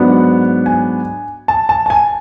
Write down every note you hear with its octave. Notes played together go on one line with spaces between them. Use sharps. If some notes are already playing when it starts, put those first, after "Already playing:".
Already playing: G#2 F#3 B3 D4 F#5
G#5
A5
A5
A5
G#5